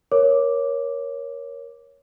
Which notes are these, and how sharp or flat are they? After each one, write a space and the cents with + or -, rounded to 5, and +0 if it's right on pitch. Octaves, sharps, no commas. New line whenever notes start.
A#4 +20 C#5 +0 D6 +0